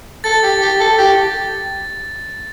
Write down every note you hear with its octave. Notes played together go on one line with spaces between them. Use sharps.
A4 A6
G4
G4
A4
G4